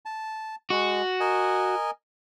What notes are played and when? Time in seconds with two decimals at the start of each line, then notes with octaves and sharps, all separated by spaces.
0.06 A5
0.70 G#3 F#4
1.20 A#4 D#5 G#5